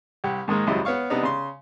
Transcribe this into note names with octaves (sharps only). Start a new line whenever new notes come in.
C2 G4 F#5
G#2 D#3 G#3 A#3
G#1 C#2 F#2 G3 E4 D#5
B3 C#5 F5 C#6
C3 B3 D4 D#4
C#3 C6